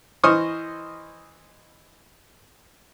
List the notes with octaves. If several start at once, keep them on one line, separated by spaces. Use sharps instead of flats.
E3 C5 D#5 C#6 D#6 F6